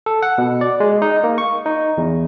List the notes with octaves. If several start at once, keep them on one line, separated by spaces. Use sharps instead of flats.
A4
F#5
B2
D5
G#3
D#4
A#3
C#6
D#4
E2